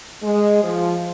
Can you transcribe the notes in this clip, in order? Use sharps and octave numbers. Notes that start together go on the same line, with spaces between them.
G#3
F3